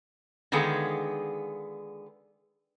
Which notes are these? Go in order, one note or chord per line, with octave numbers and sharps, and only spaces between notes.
D3 D#3 G#3 B3 F4 G#4